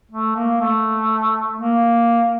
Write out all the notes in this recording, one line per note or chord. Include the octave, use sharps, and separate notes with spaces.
A3
A#3
A3
A#3